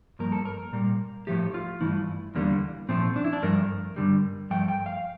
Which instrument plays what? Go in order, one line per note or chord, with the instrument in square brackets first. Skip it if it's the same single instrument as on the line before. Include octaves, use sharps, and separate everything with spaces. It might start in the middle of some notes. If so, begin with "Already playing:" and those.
[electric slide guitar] G2 F3 A#3 A#4
A4
A#4
A#2 G3 A#3
A2 F3 A3 G4
F4
G2 E3 A3 E4
E2 D3 G3 A#3
A#2 F3 A3 C4
D4
E4
D4
G2 F3 A3 A#4
G2 D3 G3
G2 F3 A3 G5
G5
F5